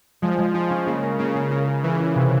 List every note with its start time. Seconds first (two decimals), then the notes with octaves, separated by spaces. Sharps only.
0.22 F3 G#3
0.38 G#3
0.54 F3 F4
0.70 C#4
0.87 C#3 A#3
1.02 A#4
1.19 C#3 A#3
1.35 A#3
1.50 C#3 A#4
1.67 A#4
1.83 E3 A#4
1.99 A#4
2.15 C3